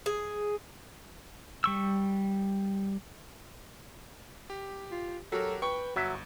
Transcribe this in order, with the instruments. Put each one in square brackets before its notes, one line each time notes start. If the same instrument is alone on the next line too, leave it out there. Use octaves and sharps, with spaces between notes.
[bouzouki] G#4
[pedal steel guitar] G3 C#6 E6
[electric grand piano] G4
[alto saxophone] F4
[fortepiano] F#3 [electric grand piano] F#4 G4 A#4 [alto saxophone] A4
[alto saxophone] B4 [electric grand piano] G5 [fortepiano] C#6
[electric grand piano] G1 [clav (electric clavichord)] F#3 E5 [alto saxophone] F#4